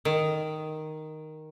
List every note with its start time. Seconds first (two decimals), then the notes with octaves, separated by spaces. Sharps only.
0.05 D#3